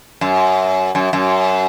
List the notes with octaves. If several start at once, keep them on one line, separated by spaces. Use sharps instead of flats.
F#2
F#2
F#2